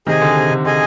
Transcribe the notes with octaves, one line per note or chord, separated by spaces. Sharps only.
C3 D#3 G#4 D#5 G#5
D3
C3
D3
D3 G#4 D#5 G#5